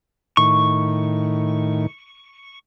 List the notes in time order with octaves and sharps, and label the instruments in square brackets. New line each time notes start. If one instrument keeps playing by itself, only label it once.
[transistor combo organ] A2 D#3 [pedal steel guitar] C#6